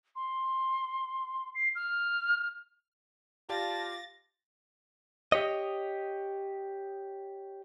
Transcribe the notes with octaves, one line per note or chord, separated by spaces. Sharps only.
C6
C7
F6
F4 G4 D5 F5 A5 A6 A#6
G4 C#5 D#5